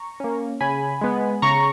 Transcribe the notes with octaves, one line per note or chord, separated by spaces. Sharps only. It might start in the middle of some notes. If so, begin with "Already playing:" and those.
Already playing: A#5 C#6
A#3 C#4
C#3 G#5 B5
G#3 B3
C#3 A#5 C#6